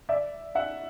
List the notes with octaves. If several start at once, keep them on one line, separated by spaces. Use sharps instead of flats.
D5 E5
E5 F#5